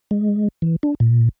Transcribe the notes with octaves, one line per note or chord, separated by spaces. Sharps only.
G#3
E3
D4
A#2